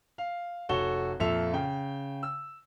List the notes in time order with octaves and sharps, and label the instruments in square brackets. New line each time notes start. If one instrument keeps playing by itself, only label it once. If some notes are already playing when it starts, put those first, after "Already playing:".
[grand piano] F5
F1 F#4 A4 C#5 E7 G7
F2 A#2 A4 E5 F7
C#3 G5
E6